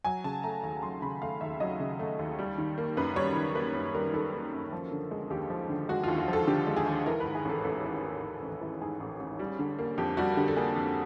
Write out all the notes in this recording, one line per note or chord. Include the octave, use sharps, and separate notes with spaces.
F#3 G#5
C#3 A5
A3 A#5
D#2 A#5
F#3 C6
C#3 B5
A3 F5
D#2 E5
F#3 D#5
C#3
A3
D#2
G3
D#3
A#3
F#2 B4
G3 C#5
D#3
A#3 B4
F#2
G3 A#4
D#3 A4
A#3
F#2
F3
D3
G#3
D#2 G4
F3
D3
G#3 F#4
D#2 F4
F#4
F3
A4
D3 G4
G#3
G#4
D#2
E3 A#4
G#2 B4
G#4
A1 A4
A1 A4
E3
G#2
A1
A1
E3
G#2 G#4
A1
A1
G3
D3
A#3
F2 G4
G3 F#4
D3 G4
A4
A#3 G#4
F2